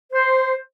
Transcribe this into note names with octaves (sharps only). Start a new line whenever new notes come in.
C5